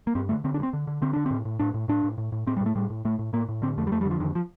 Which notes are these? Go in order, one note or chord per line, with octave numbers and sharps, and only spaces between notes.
A#3
G2 C4
D3 A3
D3 C4
D4
G2
C4
D3
D3
D3 C4
D3 D4
A2 C4
A2
A2 D4
A2
A2 D4
A2
A2
A2
A2 C4
G3
A2
A3
A2 G3
A2
A2 A3
A2
A2 A#3
A2
D3 C4
F2 A3
G3
F2 A3
G3
D3
F3
F2 D#3
F3